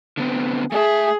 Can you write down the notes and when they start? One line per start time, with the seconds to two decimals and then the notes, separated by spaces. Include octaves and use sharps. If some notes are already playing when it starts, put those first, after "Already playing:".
0.17 D3 B3 C4
0.72 A3 G#4 D5 E5